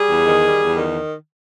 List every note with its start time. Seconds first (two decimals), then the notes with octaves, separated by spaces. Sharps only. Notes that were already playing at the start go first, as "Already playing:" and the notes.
Already playing: G3 G#4
0.10 E2
0.27 D#3
0.44 G3
0.60 E2
0.77 D#3